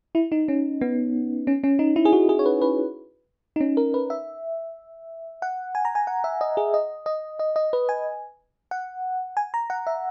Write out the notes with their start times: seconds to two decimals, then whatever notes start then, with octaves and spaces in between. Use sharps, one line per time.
0.15 E4
0.32 D#4
0.48 C#4
0.81 B3
1.47 C#4
1.64 C#4
1.79 D#4
1.96 E4
2.05 G#4
2.13 F#4
2.29 G#4
2.39 C#5
2.46 B4
2.61 B4
3.56 D#4
3.61 C#4
3.77 A#4
3.94 B4
4.10 E5
5.42 F#5
5.75 G#5
5.85 A#5
5.95 G#5
6.07 F#5
6.24 E5
6.41 D#5
6.57 G#4
6.74 D#5
7.06 D#5
7.39 D#5
7.56 D#5
7.73 B4
7.89 G#5
8.71 F#5
9.37 G#5
9.54 A#5
9.70 F#5
9.87 E5